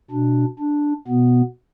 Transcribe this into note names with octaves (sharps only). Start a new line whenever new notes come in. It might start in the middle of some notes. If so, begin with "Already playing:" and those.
B2 D4
D4
B2 B3